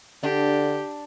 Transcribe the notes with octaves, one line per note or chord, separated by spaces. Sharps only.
D3 D4 G4